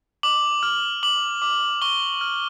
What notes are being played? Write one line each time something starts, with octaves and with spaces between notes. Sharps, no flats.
D6 F#7
F6
D6 F#7
D6
C#6 G7
F6